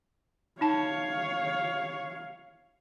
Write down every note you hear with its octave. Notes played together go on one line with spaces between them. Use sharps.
D#4 C#5 F5 A5